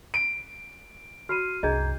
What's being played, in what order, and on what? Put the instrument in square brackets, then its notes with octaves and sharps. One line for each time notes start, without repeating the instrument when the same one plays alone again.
[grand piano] D7
[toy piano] F#4 B5 [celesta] F6 C7 D#7
[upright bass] C2 F#2 [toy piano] D4 G#4 D#5 [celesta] A#5 G6 G#6